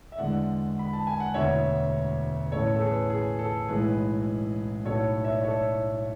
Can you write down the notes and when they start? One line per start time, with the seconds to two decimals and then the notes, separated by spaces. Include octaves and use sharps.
0.12 E5
0.17 E2 D3 G#3 D5 F#5
0.79 B5
0.93 A5
1.07 G#5
1.20 F#5
1.34 E1 D2 D3 C#5 E5
2.52 A1 A2 E3 A4 C#5
2.75 A4
2.81 G#4 B4
3.10 G#4
3.39 A4
3.68 B1 A2 E3 G#3 G#4 B4
4.85 B1 A2 F#3 A4 C#5
5.24 C#5 E5
5.34 D5
5.43 A4 C#5